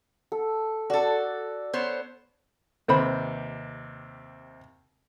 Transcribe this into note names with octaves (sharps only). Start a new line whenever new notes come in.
A4
F#4 A4 D5
B3 C5 C#5
D#2 C3 B4 C5 B5